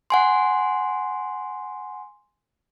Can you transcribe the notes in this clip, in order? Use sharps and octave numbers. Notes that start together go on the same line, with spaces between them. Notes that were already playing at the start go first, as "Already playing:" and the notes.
F#5 G#5 C6